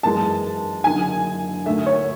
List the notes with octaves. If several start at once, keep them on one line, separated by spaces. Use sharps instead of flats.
F#2 E3 G#3 A5
F#1 F#2 D3 G#5
D2 D3 A3 E5
C#5